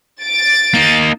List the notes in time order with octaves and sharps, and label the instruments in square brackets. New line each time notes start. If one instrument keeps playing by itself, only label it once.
[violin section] A6 D7
[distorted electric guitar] A#3 D#4